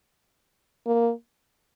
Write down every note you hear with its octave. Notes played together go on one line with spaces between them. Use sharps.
A#3